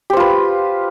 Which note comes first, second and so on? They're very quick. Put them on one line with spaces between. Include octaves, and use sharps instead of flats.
G4 C5 F4 B4